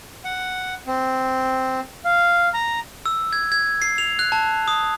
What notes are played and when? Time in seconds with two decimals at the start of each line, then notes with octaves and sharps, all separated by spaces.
0.25 F#5
0.87 C4
2.05 F5
2.54 A#5
3.06 E6
3.33 G#6
3.52 G#6
3.82 C7
3.98 F7
4.19 F#6
4.32 A5
4.68 D#6